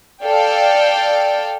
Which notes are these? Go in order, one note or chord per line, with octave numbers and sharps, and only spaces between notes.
A4 D5 F5 G5